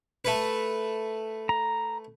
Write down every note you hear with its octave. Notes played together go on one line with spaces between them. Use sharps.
A3 B4
A#5